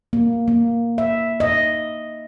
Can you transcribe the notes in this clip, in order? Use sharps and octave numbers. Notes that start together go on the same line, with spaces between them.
A#3
A#3
E5
D#5